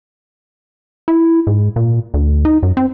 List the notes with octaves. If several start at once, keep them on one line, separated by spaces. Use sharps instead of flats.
E4
G#2
A#2
D2
D#4
F#2
C4